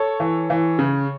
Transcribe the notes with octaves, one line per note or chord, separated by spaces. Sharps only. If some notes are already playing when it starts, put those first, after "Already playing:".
Already playing: A4 C#5
E3
E3
C#3